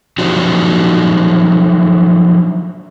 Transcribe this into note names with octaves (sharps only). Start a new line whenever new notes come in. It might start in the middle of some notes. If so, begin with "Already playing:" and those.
F3 F#3 D4 D#4 F#4 G4